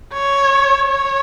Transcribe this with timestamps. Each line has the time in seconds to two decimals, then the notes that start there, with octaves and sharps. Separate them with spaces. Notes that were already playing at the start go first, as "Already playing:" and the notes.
0.13 C#5
0.88 C#5